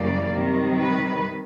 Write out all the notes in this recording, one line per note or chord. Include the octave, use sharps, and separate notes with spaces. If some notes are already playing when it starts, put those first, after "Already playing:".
Already playing: F#2 C#3 E3 G3 A#3 D5
C3 D#3 G3
B4